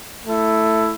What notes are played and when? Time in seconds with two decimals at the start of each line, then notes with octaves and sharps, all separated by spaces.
0.24 A3 E4